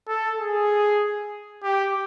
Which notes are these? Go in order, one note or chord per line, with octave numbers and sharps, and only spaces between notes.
A4
G#4
G4